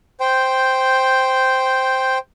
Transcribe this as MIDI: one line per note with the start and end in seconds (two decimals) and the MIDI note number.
0.20 2.18 72
0.20 2.18 79